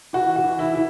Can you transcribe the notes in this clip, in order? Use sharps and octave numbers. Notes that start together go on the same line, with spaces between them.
E3 F#4
F#4
E3
E4
E4